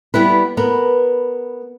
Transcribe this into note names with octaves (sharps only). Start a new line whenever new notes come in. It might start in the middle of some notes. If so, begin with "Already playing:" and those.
G3 B3 E4 B4
B3 A#4